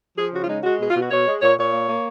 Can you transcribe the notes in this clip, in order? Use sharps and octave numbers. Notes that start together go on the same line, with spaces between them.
F3 G#4
C#3 F#4
F4
G#3 D#4
G#3 F#4
B2 G#4
F4
B2
F#4
B2 C#5
G#3
A#2 C#5
A#2 C#5
A#3
A#3